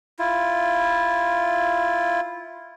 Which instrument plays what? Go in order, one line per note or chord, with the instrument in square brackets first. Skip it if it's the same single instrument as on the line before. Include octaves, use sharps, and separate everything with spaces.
[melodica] E4 F4